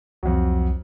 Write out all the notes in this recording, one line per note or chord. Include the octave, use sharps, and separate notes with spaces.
C2 F2 F#3